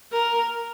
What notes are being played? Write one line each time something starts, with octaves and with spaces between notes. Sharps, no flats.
A#4